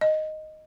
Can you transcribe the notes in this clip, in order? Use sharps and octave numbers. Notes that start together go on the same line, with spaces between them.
D#5